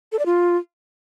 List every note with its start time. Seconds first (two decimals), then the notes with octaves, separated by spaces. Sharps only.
0.12 A4
0.19 D5
0.26 F4